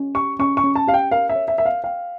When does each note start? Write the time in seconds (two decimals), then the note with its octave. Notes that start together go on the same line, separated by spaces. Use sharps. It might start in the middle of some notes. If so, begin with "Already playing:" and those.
Already playing: C#4
0.15 G4 C#6
0.39 C#4 C#6
0.57 C#6
0.64 C#4
0.76 A5
0.87 G4 F5
0.94 G5
1.11 A#4 F5
1.29 E5
1.35 C#5
1.48 E5
1.58 A#4 E5
1.65 F5
1.84 F5 G5